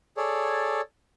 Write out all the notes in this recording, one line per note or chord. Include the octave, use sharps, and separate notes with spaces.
G#4 A4 C#5 D5